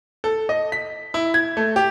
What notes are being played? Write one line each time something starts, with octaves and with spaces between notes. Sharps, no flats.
A4
D#5
B6
E4
G#6
A3
G4